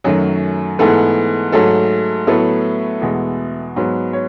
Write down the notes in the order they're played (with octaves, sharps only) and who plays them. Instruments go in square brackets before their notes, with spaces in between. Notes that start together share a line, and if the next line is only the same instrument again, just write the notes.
[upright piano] F#2 D#3 F#3 A3 F#4
G#2 E3 A3 B3 A4
G#2 F#3 A3 A4
A2 F#3 A3 B3 A4
E2 B2 G#3 B3
G#2 F#3 B3
C#5